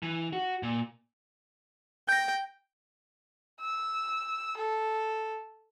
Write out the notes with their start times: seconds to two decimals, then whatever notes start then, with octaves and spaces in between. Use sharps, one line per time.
0.03 E3
0.33 F#4
0.63 A#2
2.09 G5 G6 A#6
3.61 E6
4.57 A4